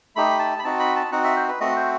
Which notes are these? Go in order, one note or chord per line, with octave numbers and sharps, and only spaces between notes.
A3 D#4 G4 B5
A5
B5
C4 D#4 F#4 A5
B5
A5
C4 D#4 F#4 F#5
E5
C5
B4
A3 C4 F#4 D#5
C5